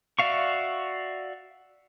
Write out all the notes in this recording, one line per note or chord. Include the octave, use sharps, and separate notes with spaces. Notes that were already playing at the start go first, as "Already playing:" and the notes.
F#4 D5 E5 F5 C#6